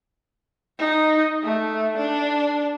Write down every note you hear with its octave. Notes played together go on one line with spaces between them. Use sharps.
D#4
A3
D4